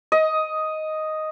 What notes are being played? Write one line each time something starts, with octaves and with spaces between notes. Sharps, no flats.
D#5